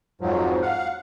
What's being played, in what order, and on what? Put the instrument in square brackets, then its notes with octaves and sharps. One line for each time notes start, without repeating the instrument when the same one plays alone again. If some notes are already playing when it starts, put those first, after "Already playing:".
[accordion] F2 G#2 F3 F#3
F5 F#5